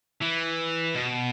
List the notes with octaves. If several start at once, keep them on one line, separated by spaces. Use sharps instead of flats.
E3
B2